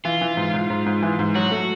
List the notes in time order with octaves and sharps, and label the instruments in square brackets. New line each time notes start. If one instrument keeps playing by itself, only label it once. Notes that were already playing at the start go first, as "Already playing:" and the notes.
[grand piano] E3 [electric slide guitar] F4
[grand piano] E3
G#2
G#2
G#2
G#2
E3
G#2
[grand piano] F#3 [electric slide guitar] F#4
[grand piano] A3